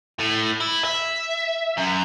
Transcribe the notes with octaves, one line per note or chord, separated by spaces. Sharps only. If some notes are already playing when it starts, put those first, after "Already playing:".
A2
E4
E5
F#2